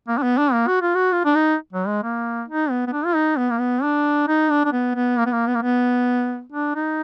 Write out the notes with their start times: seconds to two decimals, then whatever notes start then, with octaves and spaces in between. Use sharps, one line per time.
0.08 A#3
0.18 D4
0.23 B3
0.38 D4
0.53 A#3
0.67 F#4
0.82 F4
0.95 F#4
1.12 F4
1.25 D4
1.35 D#4
1.73 F#3
1.87 G#3
2.03 A#3
2.48 D#4
2.70 B3
2.87 B3
2.93 D4
3.05 F4
3.15 D#4
3.38 B3
3.50 A#3
3.60 B3
3.83 D4
4.28 D#4
4.50 D4
4.65 D4
4.72 B3
4.95 B3
5.18 A#3
5.26 B3
5.32 A#3
5.47 B3
5.55 A#3
5.62 B3
6.52 D4
6.75 D#4